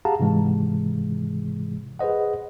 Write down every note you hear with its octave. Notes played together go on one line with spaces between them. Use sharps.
G4 G#4 F5 F#5 A5 A#5
G#2 C3 E3 G#3
G#4 B4 C5 D#5 F#5